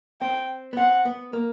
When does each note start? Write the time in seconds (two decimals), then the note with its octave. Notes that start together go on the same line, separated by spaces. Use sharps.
0.21 C4 G5
0.73 B3
0.77 C4 F#5
1.05 B3
1.33 A#3